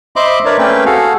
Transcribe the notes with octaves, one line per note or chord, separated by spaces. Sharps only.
C5 D#5 E5 B5 C6 D6
D4 A#4 B4 C#5 D5 E5
A3 A#3 C4 C#4 B4 G5
F#4 G#4 A4 F5